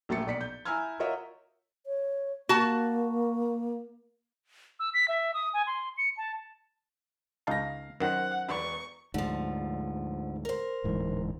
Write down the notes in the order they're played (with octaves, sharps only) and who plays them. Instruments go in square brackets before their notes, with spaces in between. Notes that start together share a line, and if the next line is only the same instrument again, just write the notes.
[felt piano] A#1 F#3 A3 A#3 A6 C#7
B1 D5 B6 C#7
G6
E4 G#5 A#5 E6 F6 G#6
F4 F#4 A#4 C#5 D#5 E5
[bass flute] C#5
[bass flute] A#3 [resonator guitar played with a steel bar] F#4 A5
[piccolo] E6
B6
E5
D#6
G#5
C6
C#7
A5
[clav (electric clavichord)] C#2 D#4 A5 [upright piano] F5 A#6
[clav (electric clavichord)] F#2 D#3 [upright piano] C5 [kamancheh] F#5
[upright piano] E1 B4 D5 [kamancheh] C#6
[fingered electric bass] D2 G#2 [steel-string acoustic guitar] D3 F3
[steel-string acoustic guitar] A#4 C5
[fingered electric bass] D1 G#2 E3